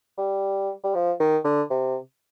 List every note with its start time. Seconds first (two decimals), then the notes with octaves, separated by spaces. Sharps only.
0.18 G3
0.84 G3
0.95 F3
1.20 D#3
1.45 D3
1.70 C3